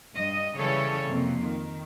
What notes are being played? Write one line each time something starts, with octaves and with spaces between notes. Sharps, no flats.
G2 D#5
C#3 E3 G3 A4 C#5
F2 C3 A#3
D#3